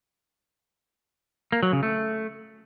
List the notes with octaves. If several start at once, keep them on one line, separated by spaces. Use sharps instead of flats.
A#3
F#3
C#3
A3